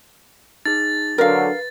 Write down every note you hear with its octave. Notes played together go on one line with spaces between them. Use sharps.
D#4 G#4 A6
D3 F#3 A#4 B4 F5